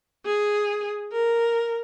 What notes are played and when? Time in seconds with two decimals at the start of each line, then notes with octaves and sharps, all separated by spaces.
0.26 G#4
1.12 A#4